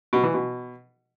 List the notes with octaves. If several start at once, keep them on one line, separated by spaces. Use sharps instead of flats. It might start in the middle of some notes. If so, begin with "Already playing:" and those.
B2
E3
B2